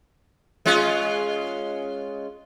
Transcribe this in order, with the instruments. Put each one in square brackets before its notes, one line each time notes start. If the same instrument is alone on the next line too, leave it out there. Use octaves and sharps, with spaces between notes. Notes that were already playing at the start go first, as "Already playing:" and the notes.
[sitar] G#3 C#4 F4